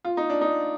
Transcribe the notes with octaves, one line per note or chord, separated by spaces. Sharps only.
F4
D#4
D4
D#4